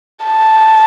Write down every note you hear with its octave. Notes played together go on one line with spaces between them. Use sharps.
A5